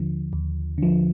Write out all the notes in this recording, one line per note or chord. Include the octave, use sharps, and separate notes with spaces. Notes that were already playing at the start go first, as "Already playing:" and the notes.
Already playing: D#2 D3 F3
D#2
D3 F3